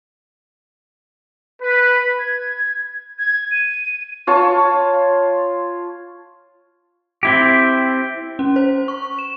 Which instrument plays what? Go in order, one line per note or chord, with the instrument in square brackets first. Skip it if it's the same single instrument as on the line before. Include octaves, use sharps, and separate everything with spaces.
[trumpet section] B4
[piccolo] G#6
G#6
D#7
[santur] F4 C#5 A5
[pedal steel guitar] C4 E4 G4
[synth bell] C#4
C5
C#6
E7